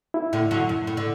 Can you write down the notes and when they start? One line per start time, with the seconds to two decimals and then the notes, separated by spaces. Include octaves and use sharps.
0.14 E4
0.33 A2 D3
0.51 D3 F#3
0.69 F#2
0.87 A2
0.97 D3